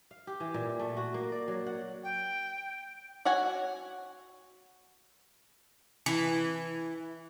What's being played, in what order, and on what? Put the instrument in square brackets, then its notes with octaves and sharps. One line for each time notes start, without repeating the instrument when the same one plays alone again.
[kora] F5
G4
E3
A#2
A3
F#4
A#3
D5
F#3
F#5
[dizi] G5
[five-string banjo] F#4 C#5 F#5 G#5
[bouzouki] E3